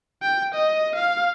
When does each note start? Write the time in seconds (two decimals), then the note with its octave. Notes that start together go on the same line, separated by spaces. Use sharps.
0.22 G5
0.54 D#5
0.95 F5